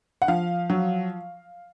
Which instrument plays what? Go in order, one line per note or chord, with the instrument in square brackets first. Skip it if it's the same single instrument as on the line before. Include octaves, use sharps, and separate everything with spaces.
[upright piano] F#5
F3 F5
F#3